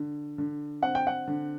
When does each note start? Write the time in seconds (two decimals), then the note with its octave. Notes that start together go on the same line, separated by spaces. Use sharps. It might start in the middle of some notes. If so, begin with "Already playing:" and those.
Already playing: D3
0.38 D3
0.82 C4 F#5
0.95 G5
1.07 F#5
1.27 D3